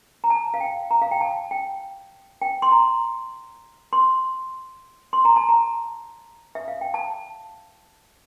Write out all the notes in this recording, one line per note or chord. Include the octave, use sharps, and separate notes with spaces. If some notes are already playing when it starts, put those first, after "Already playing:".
A#5
A5
F5
G5
A#5
F5
G5
A5
G5
G5
C6
A#5
C6
C6
A#5
A5
A#5
E5
F5
G5
A5